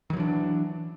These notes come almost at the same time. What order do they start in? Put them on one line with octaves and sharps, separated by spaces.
D#3 F#3 E3 D4